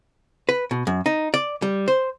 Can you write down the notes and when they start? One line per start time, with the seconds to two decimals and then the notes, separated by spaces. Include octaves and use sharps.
0.49 B4
0.71 B2
0.87 F#2
1.06 D#4
1.34 D5
1.62 G3
1.88 C5